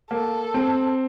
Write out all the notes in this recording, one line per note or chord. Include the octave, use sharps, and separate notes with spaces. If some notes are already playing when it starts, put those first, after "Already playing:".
A#3 A4
C4